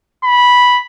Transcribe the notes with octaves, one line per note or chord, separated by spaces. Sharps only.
B5